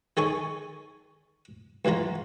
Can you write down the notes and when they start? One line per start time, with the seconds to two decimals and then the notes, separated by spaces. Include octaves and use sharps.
0.17 D#3 G#4 A4 C#5 G#5 C#6
1.85 C#2 E3 F#3 F4 A#5